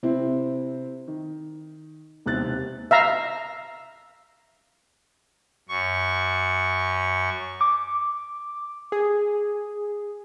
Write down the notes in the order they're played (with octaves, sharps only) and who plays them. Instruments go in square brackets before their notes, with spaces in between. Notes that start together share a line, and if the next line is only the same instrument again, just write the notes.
[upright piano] C3 C4 E4
D#3
E1 D#2 C3 C4 F#6 A6
[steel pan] E5 F5 A#5
[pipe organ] F#2 C#6
[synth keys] D6
G#4